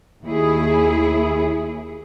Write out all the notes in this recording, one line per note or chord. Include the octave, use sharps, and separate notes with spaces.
D#2 E4 G#4